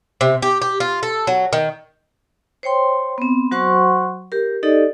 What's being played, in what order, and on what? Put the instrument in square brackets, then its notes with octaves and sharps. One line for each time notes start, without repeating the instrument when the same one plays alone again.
[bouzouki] C3
G4
G4
F4
A4
F#3
D#3
[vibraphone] C5 C#5 G5 C6
B3 C4
F#3 F#4 C5 F#5 C6 C#6
G4 A#4
D#4 G4 A4 D5 D#5